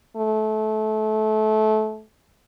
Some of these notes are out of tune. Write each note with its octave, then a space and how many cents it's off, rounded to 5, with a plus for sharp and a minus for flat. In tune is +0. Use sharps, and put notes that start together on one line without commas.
A3 -25